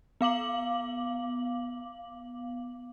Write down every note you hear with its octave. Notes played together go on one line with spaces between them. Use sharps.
B3 F5 D6 F#7